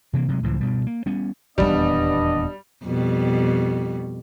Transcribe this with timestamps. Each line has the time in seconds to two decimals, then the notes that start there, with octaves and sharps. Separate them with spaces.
0.13 C3 E3 G3 A#3
0.28 C3 F#3 G#3
0.43 C#2 A2 E3 F3
0.60 G2 B2 G3
0.87 A#3
1.06 G3 B3 C#4
1.58 D#1 G#1 E2 G3 B3 D4 D#5
2.83 F2 B2 G3